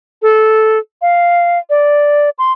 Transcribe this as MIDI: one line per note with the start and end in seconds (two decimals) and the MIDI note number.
0.22 0.78 69
1.02 1.59 77
1.70 2.30 74
2.38 2.52 84